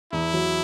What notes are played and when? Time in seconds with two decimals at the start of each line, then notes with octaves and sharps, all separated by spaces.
0.12 E2 E4
0.34 F#3